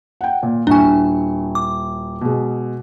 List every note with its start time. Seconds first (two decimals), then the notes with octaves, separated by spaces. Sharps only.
0.21 F#5 G5
0.43 A#2
0.67 D#1 D4 E4 G#5 C#6
1.55 D6
2.21 B2 G#3